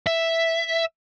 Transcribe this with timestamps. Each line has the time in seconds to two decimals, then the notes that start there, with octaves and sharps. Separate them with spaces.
0.06 E5